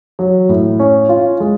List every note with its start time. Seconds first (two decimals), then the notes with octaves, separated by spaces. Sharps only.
0.19 F#3
0.49 A2
0.79 C#4
1.09 F4
1.40 G#3